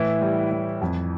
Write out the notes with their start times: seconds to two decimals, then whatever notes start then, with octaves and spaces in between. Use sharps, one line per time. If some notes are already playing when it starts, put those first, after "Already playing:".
Already playing: A2 E3 E4
0.21 G3
0.51 E3
0.81 F2